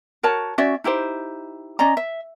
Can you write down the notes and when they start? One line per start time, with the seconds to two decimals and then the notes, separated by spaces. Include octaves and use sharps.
0.23 F#4 A#4 C#5 A5
0.58 C#4 F#4 D5 E5
0.84 D#4 E4 G4 C5
1.79 C#4 D5 D#5 A#5
1.97 E5